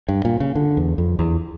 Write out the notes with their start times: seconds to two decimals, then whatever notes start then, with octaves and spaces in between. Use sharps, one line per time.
0.09 G2
0.25 A#2
0.40 C#3
0.55 D3
0.77 E2
0.98 F2
1.19 E2